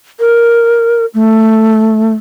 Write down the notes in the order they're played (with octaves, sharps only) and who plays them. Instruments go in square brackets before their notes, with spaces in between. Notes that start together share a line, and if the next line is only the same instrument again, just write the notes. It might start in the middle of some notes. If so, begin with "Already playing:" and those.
[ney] A#4
A3